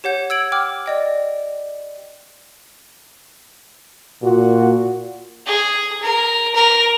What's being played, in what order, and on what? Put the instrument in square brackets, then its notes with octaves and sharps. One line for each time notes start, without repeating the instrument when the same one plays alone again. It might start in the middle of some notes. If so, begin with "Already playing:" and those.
[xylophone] G4 C#5 F#5 G6
E6 G#6 D7 F#7
G5 D6 F6
D5 D#5 G5
[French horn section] A#2 F#4
[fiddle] G#4
A#4
A#4